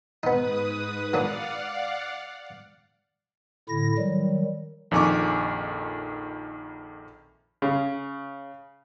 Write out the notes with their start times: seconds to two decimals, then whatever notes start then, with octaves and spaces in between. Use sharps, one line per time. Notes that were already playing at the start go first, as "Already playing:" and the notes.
0.23 G#2 B3 D#4 B4 D#6
1.13 F#3 A#3 D4 D5 F5 F#5
3.69 A2 D3 E4 A#6
3.98 D#3 F#3 G3
4.91 A#1 F2 D#3 G#5 C#6 D6
7.62 C#3